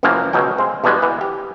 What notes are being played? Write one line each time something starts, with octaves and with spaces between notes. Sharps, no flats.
C#2 F#2 E3 F3 A#3
C#2 B2 F#3 C#4 G5
G#3 C4
E2 B2 G3 G#3 B3
E3 B3
G4